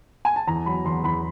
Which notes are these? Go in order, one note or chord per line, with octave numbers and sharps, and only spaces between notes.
G#5
A5
E2 A#5
F#3 B5
E2 C6
E2 B5